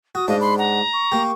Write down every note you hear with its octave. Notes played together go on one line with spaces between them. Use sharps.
F#4 D#6
G#2 D4 D#5 F5
B5 C6
F#5 A#5
C#6
A#3 G4